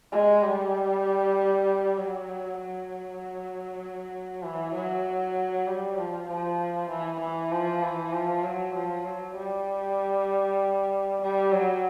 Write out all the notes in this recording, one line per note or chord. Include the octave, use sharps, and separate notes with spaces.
G#3
G3
F#3
F#3
E3
F#3
G3
F3
F3
E3
E3
F3
E3
F3
F#3
F3
F#3
G3
G3
F#3